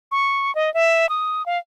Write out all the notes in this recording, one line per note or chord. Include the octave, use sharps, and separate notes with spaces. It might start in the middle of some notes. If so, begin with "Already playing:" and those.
C#6
D#5
E5
D#6
F5